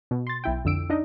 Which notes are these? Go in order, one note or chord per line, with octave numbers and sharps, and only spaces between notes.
B2
C6 A6
B1 E4 G5
F2 D3 E6 D7
D4 D#4 D#5